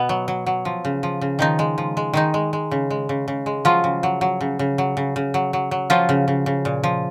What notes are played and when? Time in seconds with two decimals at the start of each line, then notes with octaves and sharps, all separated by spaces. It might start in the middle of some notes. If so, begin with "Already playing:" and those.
Already playing: B2 B3
0.09 F#3
0.28 F#3
0.46 F#3
0.65 F3
0.85 C#3
1.03 F3
1.21 C#3
1.39 D#3 F3 D#4
1.59 G#3
1.78 F3
1.97 G#3
2.13 D#3 G#3 D#4
2.34 G#3
2.53 G#3
2.71 C#3
2.90 G#3
3.09 C#3
3.28 C#3
3.46 G#3
3.65 F3 F#3 F4
3.84 C#3
4.03 F#3
4.21 F#3
4.41 C#3
4.59 C#3
4.78 F#3
4.97 C#3
5.16 C#3
5.34 F#3
5.53 F#3
5.71 F#3
5.90 F3 F#3 F4
6.09 C#3
6.28 C#3
6.46 C#3
6.65 A#2
6.83 F3